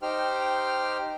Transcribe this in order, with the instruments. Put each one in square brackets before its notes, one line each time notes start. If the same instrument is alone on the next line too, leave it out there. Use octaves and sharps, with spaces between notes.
[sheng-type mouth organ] D#4 G4 C5 G5 F6